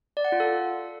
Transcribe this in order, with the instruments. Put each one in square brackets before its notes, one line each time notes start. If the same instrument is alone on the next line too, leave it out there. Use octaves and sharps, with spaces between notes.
[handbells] D5
F#5
F4
A4